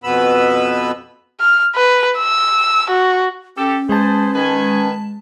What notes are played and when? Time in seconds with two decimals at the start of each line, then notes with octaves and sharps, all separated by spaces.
0.04 F2 B2 B3 B4 B5 E6
1.40 F6
1.75 B4
2.18 E6
2.90 F#4
3.57 C#4 G4 A4
3.89 G#3 G#4 B4 C5 A5
4.34 D#3 B4 G#5